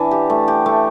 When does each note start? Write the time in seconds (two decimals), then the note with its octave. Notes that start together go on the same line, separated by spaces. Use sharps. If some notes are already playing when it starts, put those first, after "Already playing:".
Already playing: E3 D4
0.11 G4
0.30 A3
0.48 G4
0.66 A3